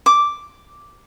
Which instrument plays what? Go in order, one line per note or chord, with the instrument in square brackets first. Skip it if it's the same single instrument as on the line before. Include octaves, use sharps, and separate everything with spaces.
[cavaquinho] D6